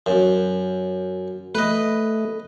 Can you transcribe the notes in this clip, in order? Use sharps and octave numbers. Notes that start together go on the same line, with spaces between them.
F#2
A3 B4 D#5